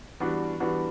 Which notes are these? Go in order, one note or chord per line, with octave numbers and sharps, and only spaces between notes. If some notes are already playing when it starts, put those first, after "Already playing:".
E3 G3 B3 D4 F#4
E3 G3 B3 D4 F#4